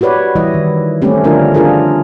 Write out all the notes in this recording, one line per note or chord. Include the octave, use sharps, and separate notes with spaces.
F#4 G4 B4 C#5 D5
E3 G3 E4 D#5
D#3
G3 A3 C4 C#4 G4
D3 F3 D4 F4 A#4
D4 F4 G#4 A#4